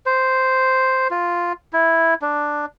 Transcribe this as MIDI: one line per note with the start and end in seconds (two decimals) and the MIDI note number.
0.06 1.08 72
1.11 1.53 65
1.73 2.14 64
2.22 2.65 62